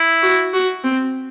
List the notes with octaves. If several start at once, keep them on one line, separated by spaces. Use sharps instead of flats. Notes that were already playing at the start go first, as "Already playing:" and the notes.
Already playing: E4
F#4
F#4
C4